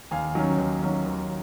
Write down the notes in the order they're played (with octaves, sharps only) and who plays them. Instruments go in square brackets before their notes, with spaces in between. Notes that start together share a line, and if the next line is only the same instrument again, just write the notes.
[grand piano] D#2 F5 G#5
D#3 F#3 C#4
D#2
D#3 F#3 C#4
D#2